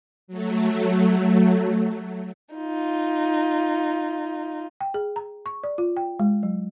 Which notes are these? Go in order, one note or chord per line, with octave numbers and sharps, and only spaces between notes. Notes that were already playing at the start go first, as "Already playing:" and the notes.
F#3 A3
D#4 F4
G5
G#4
A#5
C#6
D5
F4
G5
G#3
F#3